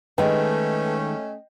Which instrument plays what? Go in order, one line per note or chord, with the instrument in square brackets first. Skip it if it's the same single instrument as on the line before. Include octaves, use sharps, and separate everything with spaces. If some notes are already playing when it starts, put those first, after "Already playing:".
[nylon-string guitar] D#3 G#3 [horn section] A3 C#4 [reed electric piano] B4 [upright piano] D#5 G5